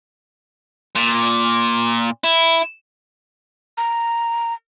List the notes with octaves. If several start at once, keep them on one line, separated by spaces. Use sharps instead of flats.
A#2
E4
A#5